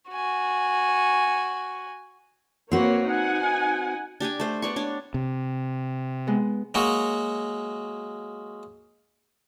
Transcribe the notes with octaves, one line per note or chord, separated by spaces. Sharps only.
F#4 G#5
A#3 C4 F#4 B4 C#5
D#4 F#5 G#5
D4 G4 G5 G#5
A3 C5
B3 D5 C#6
D4 C#5
C3
G#3 B3
F#3 G#3 A#3 F#4